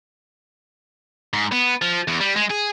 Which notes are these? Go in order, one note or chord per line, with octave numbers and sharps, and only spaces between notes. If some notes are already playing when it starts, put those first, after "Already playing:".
G#2
B3
F3
E2
G3
G#3
G#4